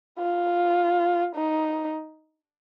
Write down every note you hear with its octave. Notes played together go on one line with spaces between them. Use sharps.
F4
D#4